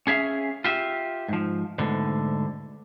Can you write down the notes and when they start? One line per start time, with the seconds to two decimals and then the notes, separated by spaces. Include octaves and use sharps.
0.07 C#4 G#4 E5 F5
0.64 F4 G4 E5
1.28 G#2 F3
1.78 D2 G#2 B2 D3